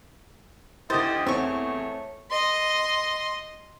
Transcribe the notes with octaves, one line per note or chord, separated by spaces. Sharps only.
D2 E4 G4 C5 D#5 D#6 A6
E2 A3 C4 C#5 C#6 E6
D#5 C6